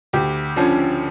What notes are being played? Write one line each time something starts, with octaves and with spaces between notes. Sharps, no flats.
D2 G4
D3 F3 C#4